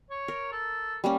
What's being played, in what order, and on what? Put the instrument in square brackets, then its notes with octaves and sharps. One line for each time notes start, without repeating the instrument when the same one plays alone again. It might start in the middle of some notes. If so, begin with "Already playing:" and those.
[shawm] C#5
[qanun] A#4
[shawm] A4
[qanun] G3 A#3 C#4